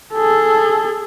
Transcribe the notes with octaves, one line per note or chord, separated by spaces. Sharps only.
G#4 A4